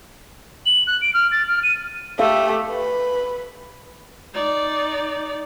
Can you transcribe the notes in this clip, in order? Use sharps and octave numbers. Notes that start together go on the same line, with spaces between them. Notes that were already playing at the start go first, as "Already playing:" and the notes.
F#7
F#6
D7
F6
A6
F6
D#7
A3 G4 A4 E5 F5
B4
D#4 D5